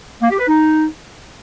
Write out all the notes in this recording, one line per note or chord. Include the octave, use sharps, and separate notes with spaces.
A#3
G4
B4
D#4